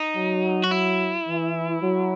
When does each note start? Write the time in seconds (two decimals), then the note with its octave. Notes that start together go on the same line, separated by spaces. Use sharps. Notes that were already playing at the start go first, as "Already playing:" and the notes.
Already playing: D#4
0.16 F#3
0.64 F#4
0.71 E4
1.26 E3
1.81 F#3